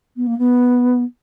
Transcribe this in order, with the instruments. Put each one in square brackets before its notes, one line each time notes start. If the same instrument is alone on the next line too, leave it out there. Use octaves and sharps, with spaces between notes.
[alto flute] B3
A#3
B3